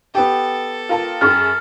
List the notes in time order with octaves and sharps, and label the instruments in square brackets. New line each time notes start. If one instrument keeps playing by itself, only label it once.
[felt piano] B3 G4 [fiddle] A4
[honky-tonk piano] F4 A#4 A5
[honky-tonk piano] F#2 G#4 C#6 [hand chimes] F6